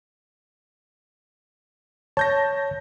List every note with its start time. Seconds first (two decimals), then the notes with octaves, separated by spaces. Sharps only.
2.17 C#5 A5 G6 A#6